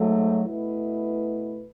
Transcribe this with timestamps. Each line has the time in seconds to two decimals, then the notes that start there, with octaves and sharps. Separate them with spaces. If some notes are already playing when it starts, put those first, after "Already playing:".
Already playing: G#2 F#3 A3
0.45 B2 A3 E4 B4